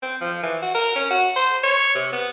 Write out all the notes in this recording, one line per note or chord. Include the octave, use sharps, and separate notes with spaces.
C4
F3
E3
F#4
A#4
C#4
F#4
C5
C#5
C3
B3